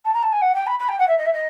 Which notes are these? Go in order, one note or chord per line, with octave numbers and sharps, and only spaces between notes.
A5
A#5
A5
G#5
F#5
G5
B5
B5
G5
F#5
E5
D#5
E5
D#5